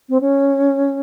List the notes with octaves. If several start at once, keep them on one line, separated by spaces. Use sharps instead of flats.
C4
C#4